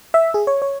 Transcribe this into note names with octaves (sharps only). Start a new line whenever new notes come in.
E5
G#4
C#5
C#5